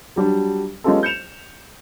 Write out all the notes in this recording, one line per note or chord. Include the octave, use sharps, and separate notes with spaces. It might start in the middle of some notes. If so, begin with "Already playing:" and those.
F#3 G3 D4
G#3 B3 C#4 F4 G4 A4
G6 C#7 E7 F7